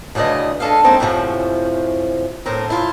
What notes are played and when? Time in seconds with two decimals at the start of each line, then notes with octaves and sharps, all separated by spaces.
0.15 D2 C#3 E3 D5 D#5
0.60 G#3 D4 A4 D#5 F5
0.84 G#3 A#3 C4 C#4 D#4 A4
1.00 F#2 A2 C3 D#3 F3 C#4
2.46 A2 C4 A#4
2.68 G#2 E4 F4